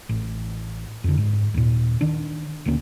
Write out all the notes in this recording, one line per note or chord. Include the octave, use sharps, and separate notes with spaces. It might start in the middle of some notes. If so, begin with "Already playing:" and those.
A1
F2 D3
G#2
D#2 A#2
D#3 D4
D#1 D2 A#3 C#4